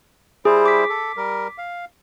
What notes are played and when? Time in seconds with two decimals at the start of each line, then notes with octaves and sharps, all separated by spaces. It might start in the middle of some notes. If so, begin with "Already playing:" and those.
0.45 G3 E4 G#4 C5
0.66 D6 B6
0.89 A4
1.17 G3 A#4
1.58 F5